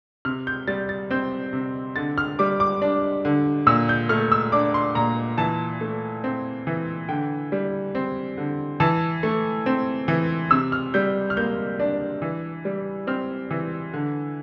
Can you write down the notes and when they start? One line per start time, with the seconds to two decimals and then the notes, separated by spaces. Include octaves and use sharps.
0.25 C3 F6
0.47 G6
0.68 G3 A6
0.89 A6
1.11 C4 G6
1.53 C3
1.96 D3 A6
2.18 F6
2.39 G3 D6
2.60 D6
2.82 D4
3.25 D3
3.67 A#2 E6
3.89 G6
4.09 A3 F6
4.32 E6
4.52 D4 D6
4.74 C6
4.95 A#2 A#5
5.38 E3 A5
5.81 A3
6.24 C4
6.67 E3
7.09 D3 G5
7.52 G3
7.95 C4
8.37 D3
8.80 E3 A5
9.23 A3
9.66 C4
10.08 E3
10.51 C3 E6
10.72 F6
10.94 G3 G6
11.30 F6
11.37 A#3 G6
11.80 D4
12.22 E3
12.65 G3
13.07 C4 F6
13.51 E3
13.94 D3